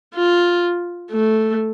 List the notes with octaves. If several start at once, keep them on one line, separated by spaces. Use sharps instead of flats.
F4
A3